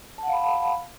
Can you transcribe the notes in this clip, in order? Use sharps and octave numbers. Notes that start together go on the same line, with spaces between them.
F5 F#5 A5 B5